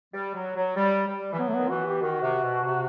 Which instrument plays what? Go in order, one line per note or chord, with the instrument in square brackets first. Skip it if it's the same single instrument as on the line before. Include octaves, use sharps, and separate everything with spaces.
[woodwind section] G3
F#3
F#3
G3
G3
E3
[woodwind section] F#3 [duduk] B3
[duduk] A3
[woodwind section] D#3 [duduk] B3
[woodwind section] E3 [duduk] F#4
[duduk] G4
[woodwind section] D#3 [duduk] F#4
[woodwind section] C3
B2
C3